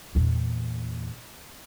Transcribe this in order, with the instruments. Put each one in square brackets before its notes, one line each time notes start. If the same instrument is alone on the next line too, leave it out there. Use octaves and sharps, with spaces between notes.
[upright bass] E2 A#2